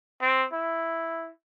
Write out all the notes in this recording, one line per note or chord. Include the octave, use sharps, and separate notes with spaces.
C4
E4